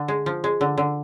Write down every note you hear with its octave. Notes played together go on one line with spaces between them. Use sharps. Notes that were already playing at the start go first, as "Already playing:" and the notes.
Already playing: D3
G#3
F3
G#3
D3
D3